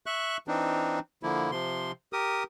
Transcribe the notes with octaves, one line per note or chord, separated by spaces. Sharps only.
E5 C#6 F#6
E3 C4 D4 D#4
D3 F3 A#3 E4
C3 F3 C6
G4 A#4 D#6